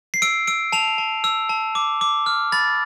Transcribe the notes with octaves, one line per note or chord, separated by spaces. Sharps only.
C7
E6 D7
E6 D7
A5 F7
A5
E6
A5
D6
D6
F6
B5 A6